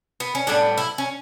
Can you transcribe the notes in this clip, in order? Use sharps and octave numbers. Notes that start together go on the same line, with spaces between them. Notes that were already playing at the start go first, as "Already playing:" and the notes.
B3
C#4
A2 G3 B3 D4
E4
C#4